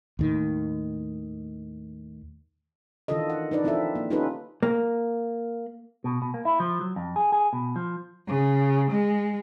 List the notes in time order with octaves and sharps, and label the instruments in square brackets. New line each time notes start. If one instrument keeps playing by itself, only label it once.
[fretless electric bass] D#2 A2 D#3
[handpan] D#3 E3 D4 F4 A4 D#5
F#5
D4 D#4 B4 D5
F3 C4 E4 F4 A4 E5
A#3
C#4 D#4 F4 G4 A4 B4
[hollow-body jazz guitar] A#3
[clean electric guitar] B2
B2
A#3
E4
F3
F#3
F2
G#4
G#4
B2
F3
[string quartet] C#3
G#3